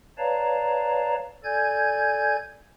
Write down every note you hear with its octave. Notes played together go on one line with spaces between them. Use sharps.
B4 C#5 D5 F5 A5 A#5
A4 D5 G#5 G6 G#6